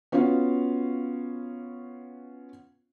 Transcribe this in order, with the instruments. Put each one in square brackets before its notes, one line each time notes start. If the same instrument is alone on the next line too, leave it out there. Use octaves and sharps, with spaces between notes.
[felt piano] B3 C#4 F4 F#4 F5